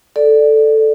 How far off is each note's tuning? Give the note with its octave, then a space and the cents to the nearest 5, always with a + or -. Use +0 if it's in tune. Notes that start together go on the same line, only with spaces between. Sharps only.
A4 +0 D5 +5